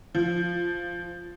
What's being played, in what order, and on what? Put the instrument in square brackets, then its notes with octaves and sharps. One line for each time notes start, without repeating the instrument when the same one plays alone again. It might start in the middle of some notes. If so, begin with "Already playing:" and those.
[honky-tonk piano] F3